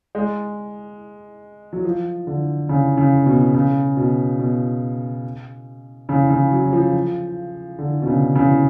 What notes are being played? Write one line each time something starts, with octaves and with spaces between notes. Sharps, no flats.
G#3
F#3
F3
D3
C#3
C#3
B2
C#3
B2
B2
C#3
C#3
F#3
F3
D3
B2
C#3
C#3